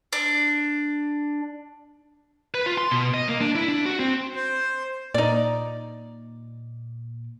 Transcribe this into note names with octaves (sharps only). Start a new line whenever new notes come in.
D4
B4
F4
C6
B2
D#5
A#3
D4
E4
D4
F#4
C4
C5
A#2 D#4 D5